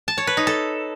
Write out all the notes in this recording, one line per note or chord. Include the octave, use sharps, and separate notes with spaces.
A5
C#5
B4
D#4
A4